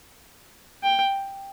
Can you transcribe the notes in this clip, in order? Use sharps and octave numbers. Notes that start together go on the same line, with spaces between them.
G5